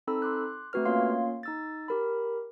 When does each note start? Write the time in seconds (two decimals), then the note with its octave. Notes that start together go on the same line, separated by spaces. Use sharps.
0.07 C4 D#4 A4 B5 E6
0.22 C6 D6 F#6
0.73 A3 C4 F#4 B4 F6
0.85 A#3 C#4 F4 C#5 F5 C6
1.43 D#4 E6 A6
1.88 G4 A#4 B5